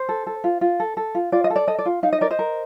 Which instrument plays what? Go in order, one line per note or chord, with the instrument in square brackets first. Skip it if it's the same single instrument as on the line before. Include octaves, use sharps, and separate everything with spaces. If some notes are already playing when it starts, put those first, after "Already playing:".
Already playing: [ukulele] C5
A4
A4
F4
F4
A4
A4
F4
F4 D5
D#5
A4
D5
A4 D#5
D5
F4
D#4 F5
D#5
A#4 D5
C5 D#5
A#4